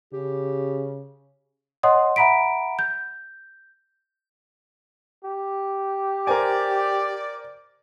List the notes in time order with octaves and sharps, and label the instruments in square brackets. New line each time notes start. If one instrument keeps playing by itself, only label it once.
[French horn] C#3 [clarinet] G4
[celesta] C#5 D#5 F#5 C6 D#6
E5 F#5 A#5 B5 B6 D7
G6
[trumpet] G4
[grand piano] A#4 C5 G#5 [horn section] D5